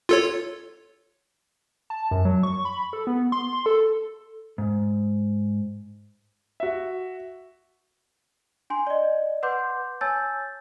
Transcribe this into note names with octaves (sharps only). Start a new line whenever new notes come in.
F4 A4 C#5
A5
F#2
F#3
C#6
B5
A4
B3
C6
C6
A4
G#2
F#4 E5
D4 G#5 C6
D5 D#5
B4 F#5 C6 D6 G6
C#5 G#5 A5 E6 G6 A6